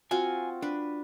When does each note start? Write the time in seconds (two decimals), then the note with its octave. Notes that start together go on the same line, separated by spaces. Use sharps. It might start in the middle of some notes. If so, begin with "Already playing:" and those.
0.11 C4 F4 F#4 G#5
0.62 D4 B4